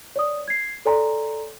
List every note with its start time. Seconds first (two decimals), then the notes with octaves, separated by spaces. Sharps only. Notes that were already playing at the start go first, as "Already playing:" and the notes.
0.16 C#5 D5 D#6
0.48 G#6 C7
0.85 A4 C#5 D5 G#5 A#5 C6